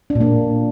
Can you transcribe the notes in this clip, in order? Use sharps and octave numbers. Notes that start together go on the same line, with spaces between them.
D4
A#2
A#3